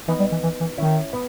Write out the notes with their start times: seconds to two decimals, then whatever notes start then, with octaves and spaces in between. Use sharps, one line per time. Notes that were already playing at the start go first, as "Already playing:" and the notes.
0.08 E3 B3 D#4
0.20 G3
0.32 E3
0.43 E3
0.60 E3
0.78 D#3 C#4 E4
1.13 B3